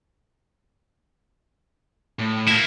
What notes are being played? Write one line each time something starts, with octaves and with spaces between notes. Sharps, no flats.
A2
A#3 E4